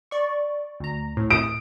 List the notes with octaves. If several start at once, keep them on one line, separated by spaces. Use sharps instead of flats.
D5 C#6
D2 A#5
A2
D#6 D7